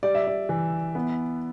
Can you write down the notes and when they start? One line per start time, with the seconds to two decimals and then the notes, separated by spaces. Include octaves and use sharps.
0.03 G3 D5
0.15 E5
0.27 D5
0.49 E3
0.95 B3